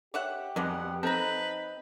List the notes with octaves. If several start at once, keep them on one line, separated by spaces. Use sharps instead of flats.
G4 C#5 E5 F#5
F2 B2 G3 G#3 F#5
C4 D#4 A4 B4 A#5